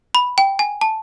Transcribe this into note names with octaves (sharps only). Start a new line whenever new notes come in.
B5
G5
G#5
A5